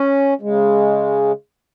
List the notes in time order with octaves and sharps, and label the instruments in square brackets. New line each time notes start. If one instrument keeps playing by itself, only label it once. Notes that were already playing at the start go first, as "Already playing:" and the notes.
Already playing: [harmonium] C#4
C#3 G#3